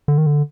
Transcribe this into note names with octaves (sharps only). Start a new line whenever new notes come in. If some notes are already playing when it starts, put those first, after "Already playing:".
D3
D#3
D3